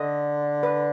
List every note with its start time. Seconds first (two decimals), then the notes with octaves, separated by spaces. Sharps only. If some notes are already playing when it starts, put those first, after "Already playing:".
Already playing: D3 D#5
0.63 B4